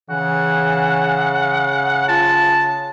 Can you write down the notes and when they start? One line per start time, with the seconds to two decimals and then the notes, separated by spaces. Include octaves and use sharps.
0.10 C#3 E3 F#5
2.08 F4 A5